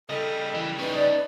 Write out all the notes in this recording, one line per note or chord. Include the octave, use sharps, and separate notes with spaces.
C#3 G3 A4 D#5
E3
C#4 D#4 B4
D5